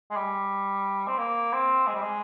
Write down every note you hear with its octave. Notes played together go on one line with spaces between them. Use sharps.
G#3
G3
C4
A#3
C4
G#3
G3
G#3